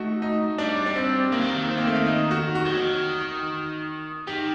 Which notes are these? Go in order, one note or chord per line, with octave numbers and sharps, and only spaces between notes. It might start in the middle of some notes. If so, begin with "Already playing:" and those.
Already playing: A3 D#4 F#4
D#4
G3 D4
D4
C4
D#3 A#3
F#3
D#3
C4
A#3
A3
A#3
D#4
F#4
F#4
G3
F#3
D#3
D#3 G4